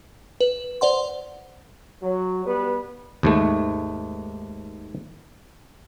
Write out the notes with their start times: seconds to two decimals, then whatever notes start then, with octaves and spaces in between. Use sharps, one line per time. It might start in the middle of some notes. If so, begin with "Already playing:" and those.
0.41 B4
0.81 C5 D5 F#5 C6
2.02 F#3
2.45 G3 B3 B4
3.23 D#2 G#2 A3